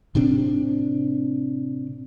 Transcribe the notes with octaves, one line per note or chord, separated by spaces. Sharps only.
A2 C3 C4 D4